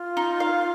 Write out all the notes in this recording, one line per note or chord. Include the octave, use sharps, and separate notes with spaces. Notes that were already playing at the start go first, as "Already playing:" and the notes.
Already playing: F4
D#4
F5